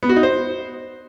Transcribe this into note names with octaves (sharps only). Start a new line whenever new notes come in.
B3
F#4
D#4
C5